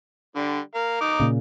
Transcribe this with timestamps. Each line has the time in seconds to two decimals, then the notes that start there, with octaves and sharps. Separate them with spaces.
0.36 D3 G3
0.75 A#4 F5
1.01 D#4 D6
1.20 A#2 C#3